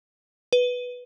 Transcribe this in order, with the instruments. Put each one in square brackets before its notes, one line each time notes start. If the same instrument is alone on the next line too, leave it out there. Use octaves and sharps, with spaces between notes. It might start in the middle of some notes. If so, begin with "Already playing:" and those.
[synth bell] B4